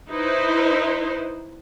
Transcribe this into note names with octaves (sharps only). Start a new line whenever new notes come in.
D#4 E4 B4 C5